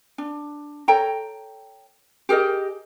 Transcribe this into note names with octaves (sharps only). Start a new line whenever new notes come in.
D4
A4 C#5 G5 A#5
G4 G#4 A#4 D#5